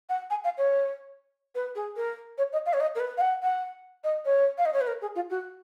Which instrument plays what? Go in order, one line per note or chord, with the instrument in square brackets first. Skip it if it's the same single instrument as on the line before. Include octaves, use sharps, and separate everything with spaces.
[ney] F#5
G#5
F5
C#5
B4
G#4
A#4
C#5
D#5
F5
C#5
D#5
A#4
B4
F5
F#5
F#5
D#5
C#5
F5
D#5
C#5
B4
A#4
G#4
F4
F#4